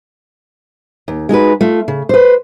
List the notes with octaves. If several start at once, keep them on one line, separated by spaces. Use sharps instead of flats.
D#2
G#3 D#4 F#4 B4
A3 F4
C#3
B4 C5